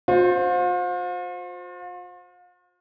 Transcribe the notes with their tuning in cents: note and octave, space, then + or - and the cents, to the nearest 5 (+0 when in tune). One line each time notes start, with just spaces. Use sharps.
F4 +40 C5 +0